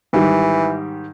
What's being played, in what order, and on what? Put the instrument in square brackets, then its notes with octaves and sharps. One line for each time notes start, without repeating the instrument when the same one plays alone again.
[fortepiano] G#2 D#3 G3 [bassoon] E3